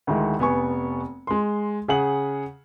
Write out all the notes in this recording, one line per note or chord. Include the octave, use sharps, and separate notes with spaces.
D2 D#3 G#3 E4
F1 B3 G#5 C#6
G#3 C6
C#3 G#4 F#5 F#7